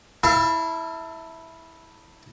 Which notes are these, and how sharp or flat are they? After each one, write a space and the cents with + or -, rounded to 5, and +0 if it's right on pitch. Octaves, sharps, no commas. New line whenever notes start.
E4 -10 A4 +30 F5 -30